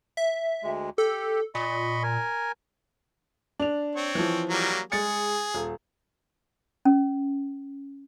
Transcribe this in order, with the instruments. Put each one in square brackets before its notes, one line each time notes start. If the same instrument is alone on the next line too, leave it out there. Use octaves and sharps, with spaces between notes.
[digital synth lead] E5
[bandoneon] D2 G#3
[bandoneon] G4 [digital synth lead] A4
[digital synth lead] A#2 [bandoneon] D#5 B5 C#6
[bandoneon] A#4 G#5
[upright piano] D4 F7
[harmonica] C4 C#5
[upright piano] E3 F3
[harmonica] F#3 G3 A#3
[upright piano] G#3 A6 C#7 [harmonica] G#4
[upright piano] D#1
[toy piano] C#4